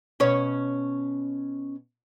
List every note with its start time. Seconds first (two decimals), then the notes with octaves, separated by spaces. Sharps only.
0.20 B2 C#4 C#5